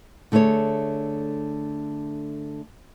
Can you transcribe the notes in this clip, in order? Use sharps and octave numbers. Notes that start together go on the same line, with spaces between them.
D3 A3 G#4 A4 C#5